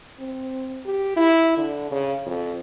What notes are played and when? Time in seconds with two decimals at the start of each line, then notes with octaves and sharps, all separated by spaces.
0.20 C4
0.86 G4
1.16 E4
1.57 D3
1.92 C#3
2.27 F2